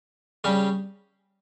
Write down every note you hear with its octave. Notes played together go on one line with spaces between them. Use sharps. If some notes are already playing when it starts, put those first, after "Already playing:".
C#3 G3 C#4 G4